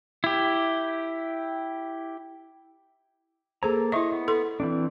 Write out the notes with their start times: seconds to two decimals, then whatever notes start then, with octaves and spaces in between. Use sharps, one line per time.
0.24 E4 G4
3.63 A#3 G#4 A4 C5 A#5
3.92 E4 D#5 E5 C#6
4.12 B3
4.28 A4 C6
4.60 E3 C4 D4